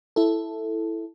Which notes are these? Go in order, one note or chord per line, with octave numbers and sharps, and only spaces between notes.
E4 A4